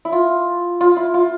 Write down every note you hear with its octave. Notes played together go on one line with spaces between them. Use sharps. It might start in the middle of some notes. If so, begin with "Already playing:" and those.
E4
F4
F4
E4
F4